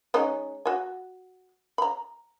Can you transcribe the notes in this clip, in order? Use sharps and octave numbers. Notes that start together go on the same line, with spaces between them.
G#3 C#4 D#4
F#4 G#5
A#5 B5